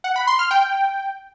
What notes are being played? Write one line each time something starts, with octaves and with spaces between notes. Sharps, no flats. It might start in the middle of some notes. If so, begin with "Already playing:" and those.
F#5
B5
C6
F6
G5